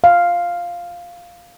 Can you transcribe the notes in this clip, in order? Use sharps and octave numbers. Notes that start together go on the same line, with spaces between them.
F5